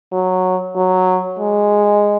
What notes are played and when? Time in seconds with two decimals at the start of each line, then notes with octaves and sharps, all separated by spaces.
0.12 F#3
0.76 F#3
1.39 G#3